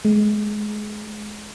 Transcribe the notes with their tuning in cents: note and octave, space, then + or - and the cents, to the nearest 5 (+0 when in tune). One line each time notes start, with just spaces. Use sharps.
G#3 +20